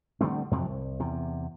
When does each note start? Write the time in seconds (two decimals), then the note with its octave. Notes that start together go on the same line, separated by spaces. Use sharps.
0.21 D3 G3 A3 C4
0.51 F2 C3 F3 F#3
0.66 C2
1.00 E2 C3